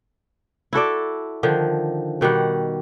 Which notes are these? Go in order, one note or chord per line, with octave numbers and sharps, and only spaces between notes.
E4 F#4 A4 D5
D3 D#3 F3
B2 D#3 G3 F#5